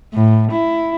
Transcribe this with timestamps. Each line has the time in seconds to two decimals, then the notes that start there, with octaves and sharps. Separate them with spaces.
0.14 A2
0.52 E4